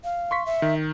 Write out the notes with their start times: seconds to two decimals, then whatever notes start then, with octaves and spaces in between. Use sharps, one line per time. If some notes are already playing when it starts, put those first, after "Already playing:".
0.04 F5
0.31 C6 C#6 B6
0.46 E5
0.62 D#3